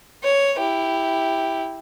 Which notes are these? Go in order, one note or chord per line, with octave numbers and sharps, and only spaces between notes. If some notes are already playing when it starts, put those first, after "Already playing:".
C#5
E4 G4